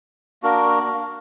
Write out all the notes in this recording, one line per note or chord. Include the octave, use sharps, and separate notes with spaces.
A#3 D4 F#4 A#4